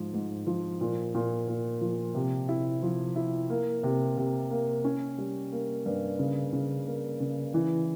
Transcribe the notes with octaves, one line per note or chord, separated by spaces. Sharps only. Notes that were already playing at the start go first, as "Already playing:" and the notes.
Already playing: G#2 F3
G#2
F3
A#2
A#2
A#2
F3
C3
E4
F3
E4
A#3
C3
C3
A#3
C#4
G3
A#3
G2
C#3
C#3
A#3
C#3
E3